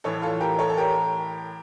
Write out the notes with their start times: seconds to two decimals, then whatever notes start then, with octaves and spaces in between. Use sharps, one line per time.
0.04 A2 E3 A3 A4 C#5
0.22 F4 A4
0.40 G4 A#4
0.59 A4 C#5
0.70 A4
0.77 G4 A#4